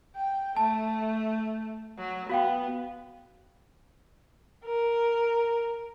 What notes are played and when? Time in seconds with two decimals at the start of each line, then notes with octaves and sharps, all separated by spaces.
0.16 G5
0.57 A3 A5
1.98 F#3
2.30 B3 F#4 F5 G5
4.65 A#4